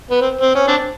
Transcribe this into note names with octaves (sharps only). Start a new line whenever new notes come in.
B3
C4
C4
C#4
C4 D4